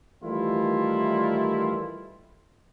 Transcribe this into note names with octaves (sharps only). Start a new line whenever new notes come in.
D#3 E3 G3 A3 E4 F4